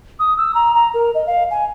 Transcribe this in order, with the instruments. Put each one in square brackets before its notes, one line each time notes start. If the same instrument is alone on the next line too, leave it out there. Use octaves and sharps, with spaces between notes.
[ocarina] D#6
E6
A#5
A#5
A#4
D#5
F5
G#5